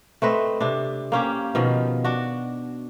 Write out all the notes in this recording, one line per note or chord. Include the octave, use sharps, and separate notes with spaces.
A3 C4 B4 D#5
C3 D4
A#3 C#4 G4
B2 D#3 F3
D4 F#4